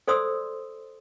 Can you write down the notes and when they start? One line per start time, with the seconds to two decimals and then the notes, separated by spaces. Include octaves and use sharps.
0.08 A4 C5 D5 C6 D#6 E6